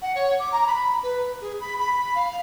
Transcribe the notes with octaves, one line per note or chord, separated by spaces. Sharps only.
F#5
C#5
D6
A#5
B5
B4
G#4
B5
B5
B5
F5